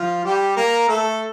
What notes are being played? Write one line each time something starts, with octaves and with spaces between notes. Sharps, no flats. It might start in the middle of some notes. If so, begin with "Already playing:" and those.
Already playing: F3 F4
G3 G4
A#3 A#4
A3 A4